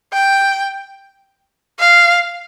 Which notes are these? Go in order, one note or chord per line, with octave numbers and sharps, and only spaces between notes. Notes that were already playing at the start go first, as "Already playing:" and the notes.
G5
F5